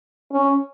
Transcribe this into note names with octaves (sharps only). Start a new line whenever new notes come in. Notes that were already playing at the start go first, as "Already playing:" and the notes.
C#4